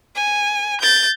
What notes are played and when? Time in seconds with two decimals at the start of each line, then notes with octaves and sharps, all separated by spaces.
0.15 G#5
0.81 G6 A6